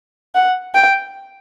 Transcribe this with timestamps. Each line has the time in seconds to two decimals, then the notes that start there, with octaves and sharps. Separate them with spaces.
0.35 F#5
0.74 G5